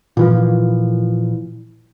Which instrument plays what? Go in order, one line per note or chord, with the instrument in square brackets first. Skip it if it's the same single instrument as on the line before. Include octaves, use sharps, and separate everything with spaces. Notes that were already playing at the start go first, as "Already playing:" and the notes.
[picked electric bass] A#2 E3 F3